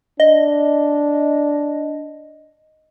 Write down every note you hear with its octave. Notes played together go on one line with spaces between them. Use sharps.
D4 D#5